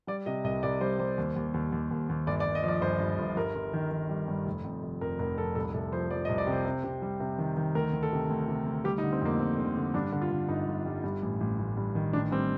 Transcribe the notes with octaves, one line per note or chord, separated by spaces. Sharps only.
G3 D5
C3 D#5
C2 D#5
C2 D5
G3 C5
G3 C5
D#2
D#2
D#2
D#2
D#2
D#2
G1 D5
D5
G1
D#5
F3 D5
G1 C5
G2
G1
G2 A#4
G1
D#3
D#3
G3
G2
F1
F2
F1
F2 A#4
F1 A#4
F2 A4
C2 A4
C2 A4
F3 C5
F3 D5
D#5
C2
D5
C3
C5
C3
C3
G3
C3
D#3
D#3
D2 A#4
D2
A4
C3
D2
C3
D2
G3 G4
D#4
D3
C4
F2 A#3
F2 C4
D3
D3
G2 D4
D3
F4
D3
G1 D#4
G1
G3
G2
A1
A1
A1
G2
D#3
A1 D4
G3 C4